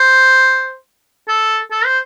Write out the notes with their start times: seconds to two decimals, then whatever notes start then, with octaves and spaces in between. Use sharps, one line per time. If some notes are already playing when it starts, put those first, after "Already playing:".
Already playing: C5
1.28 A4
1.71 A4
1.85 C5